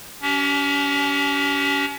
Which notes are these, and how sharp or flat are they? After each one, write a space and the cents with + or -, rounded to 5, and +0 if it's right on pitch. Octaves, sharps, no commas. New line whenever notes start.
C#4 +35 G4 -35